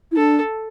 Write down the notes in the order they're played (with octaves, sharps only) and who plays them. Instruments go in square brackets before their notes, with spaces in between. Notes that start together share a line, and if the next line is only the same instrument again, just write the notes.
[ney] E4
[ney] D4 [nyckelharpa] A4